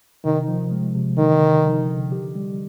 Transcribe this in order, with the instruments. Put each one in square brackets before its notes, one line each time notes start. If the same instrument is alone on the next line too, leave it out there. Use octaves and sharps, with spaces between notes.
[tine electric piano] C3 [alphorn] D#3
[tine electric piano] F3
G#3
C3
[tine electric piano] D3 [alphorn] D#3
[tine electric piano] D3
F3
D3
G4
G3